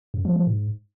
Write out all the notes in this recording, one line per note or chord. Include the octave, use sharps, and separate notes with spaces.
F#2
F3
F3
G#2